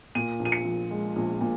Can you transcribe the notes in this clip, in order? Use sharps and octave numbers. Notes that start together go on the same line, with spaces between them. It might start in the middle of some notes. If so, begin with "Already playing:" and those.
A#2 D#7
A#1
D#7
C#7
F3
G#3
A#1
A#2